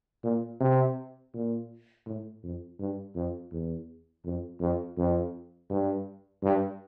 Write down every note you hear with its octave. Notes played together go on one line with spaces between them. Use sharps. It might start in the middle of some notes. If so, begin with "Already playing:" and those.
A#2
C3
A#2
A2
F2
G2
F2
E2
F2
F2
F2
G2
G2